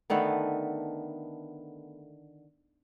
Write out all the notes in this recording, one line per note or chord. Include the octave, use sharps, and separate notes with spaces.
D3 D#3 A3 B3